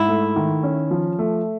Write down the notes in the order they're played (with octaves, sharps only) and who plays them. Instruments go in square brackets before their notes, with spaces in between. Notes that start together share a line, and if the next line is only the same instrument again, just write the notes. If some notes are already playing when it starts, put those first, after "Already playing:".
Already playing: [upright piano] G#2 [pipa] E4
[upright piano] A3
D#3
C#4
F3
A3